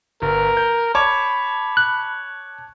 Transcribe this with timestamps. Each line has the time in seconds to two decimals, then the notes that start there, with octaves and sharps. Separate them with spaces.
0.22 G1 A#4
0.57 G6
0.95 C#5 A5 B5 D6
1.77 F#6